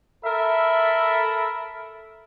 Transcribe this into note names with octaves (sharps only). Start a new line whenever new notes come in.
A4 A#4 E5 B5